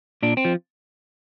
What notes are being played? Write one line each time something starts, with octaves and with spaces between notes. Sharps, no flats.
A#2 D4
C4
F3